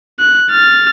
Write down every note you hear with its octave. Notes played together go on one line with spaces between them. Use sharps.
F#6
F6 A6